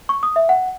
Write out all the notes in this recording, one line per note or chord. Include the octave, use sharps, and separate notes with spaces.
C#6
D#6
E5
F#5